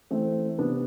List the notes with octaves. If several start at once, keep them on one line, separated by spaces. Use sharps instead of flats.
E3 A3 C4
C3 B3 D4